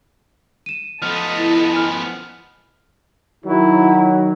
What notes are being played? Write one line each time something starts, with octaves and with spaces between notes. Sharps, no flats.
D#7 E7
F3 B3 A4 D#5 F6
E4
G#5 F6
D#3 F#3 E4